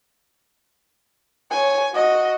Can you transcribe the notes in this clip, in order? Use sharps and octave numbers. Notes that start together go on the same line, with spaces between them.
C#5 G#5
F#4 D#5